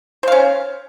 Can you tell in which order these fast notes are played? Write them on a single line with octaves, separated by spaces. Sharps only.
C5 F5 C#4